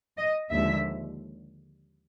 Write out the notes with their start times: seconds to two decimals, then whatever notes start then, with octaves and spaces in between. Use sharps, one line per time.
0.17 D#5
0.51 D#2 D3 F3 G#3 E5